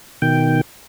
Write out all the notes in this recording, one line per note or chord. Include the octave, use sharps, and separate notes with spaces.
B2 D#3 G5